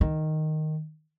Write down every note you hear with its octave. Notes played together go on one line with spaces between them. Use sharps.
D#3